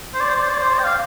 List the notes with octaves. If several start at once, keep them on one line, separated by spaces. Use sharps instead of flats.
C5
D5
C5
D5
C5
D5
C5
D5
G5
F5